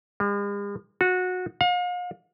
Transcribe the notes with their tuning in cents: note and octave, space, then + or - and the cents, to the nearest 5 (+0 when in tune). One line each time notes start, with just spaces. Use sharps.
G#3 -45
F#4 -20
F5 +40